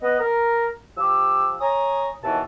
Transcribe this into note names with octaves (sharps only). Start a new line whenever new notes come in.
B3 D#5
A#4
F3 G4 E6
C#5 G#5 A#5 D#6
D#2 B2 E3 A5